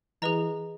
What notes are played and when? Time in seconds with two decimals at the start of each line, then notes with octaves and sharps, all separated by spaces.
0.22 E3 G#4 B4 D#5 A#5